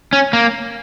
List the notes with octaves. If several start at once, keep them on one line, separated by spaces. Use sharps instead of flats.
C#4
A#3